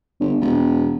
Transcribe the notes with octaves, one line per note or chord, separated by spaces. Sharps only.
G1
E1